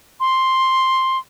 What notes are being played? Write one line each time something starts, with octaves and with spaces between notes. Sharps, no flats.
C6